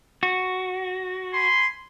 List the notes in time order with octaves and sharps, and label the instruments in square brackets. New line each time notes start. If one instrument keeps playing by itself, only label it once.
[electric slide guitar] F#4
[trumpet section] G#5 B5 C6